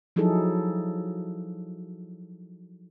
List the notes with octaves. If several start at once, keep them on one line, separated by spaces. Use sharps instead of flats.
F3 F#3 D#4 E4 G#4 A4